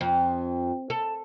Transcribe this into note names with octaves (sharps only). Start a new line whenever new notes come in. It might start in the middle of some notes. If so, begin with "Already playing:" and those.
F2
A4